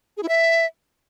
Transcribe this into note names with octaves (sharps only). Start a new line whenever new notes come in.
G#4
E4
E5